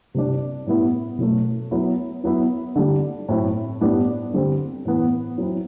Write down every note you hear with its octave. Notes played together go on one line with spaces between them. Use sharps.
C3 G3 D4
A2 G3 B3 E4
B2 F#3 A3
F#3 B3 E4
F#3 B3 E4
D3 G3 D4
A2 F#3 C4 E4
A2 G3 B3 D4
D3 G3 C4
A2 E3 B3
F#3 C4 E4